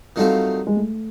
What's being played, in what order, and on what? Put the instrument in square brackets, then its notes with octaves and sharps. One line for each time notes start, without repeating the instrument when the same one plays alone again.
[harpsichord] D#3 F#3 A3 C4 F4 [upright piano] G3
[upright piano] G#3
A3